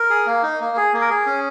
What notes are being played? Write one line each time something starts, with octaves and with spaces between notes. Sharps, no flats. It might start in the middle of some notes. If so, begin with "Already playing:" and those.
Already playing: A#4
G#4
A#3
D#4
A#3
G#4
A#3
A#4
G#4
C#4